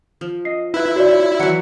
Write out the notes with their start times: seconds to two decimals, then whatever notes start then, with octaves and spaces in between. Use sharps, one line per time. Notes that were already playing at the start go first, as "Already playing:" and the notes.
0.21 F3
0.45 D#5 C7
0.74 E4 B4
0.96 F#4 C#5 D5
1.40 E3 F#3 F#5